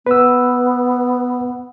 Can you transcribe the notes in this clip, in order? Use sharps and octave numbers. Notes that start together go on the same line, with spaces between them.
B3 B4 E6